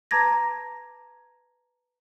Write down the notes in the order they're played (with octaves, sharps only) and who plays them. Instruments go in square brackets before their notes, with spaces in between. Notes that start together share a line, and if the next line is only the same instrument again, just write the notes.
[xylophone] B4 A5 A#5 D6 G#6 A#6